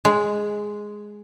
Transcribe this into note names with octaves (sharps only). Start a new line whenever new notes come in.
G#3